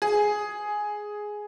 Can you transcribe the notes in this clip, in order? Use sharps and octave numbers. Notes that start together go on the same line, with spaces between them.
G#4